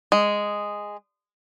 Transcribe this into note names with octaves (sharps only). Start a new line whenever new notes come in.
G#3